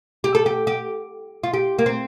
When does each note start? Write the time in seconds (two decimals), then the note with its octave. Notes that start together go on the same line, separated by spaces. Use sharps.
0.24 G4
0.35 A4
0.46 G4
0.67 G4
1.44 F4
1.53 G4
1.79 A#3
1.86 C4